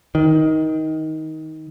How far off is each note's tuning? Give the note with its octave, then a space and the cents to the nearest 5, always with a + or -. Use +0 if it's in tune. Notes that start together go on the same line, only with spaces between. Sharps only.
D#3 +20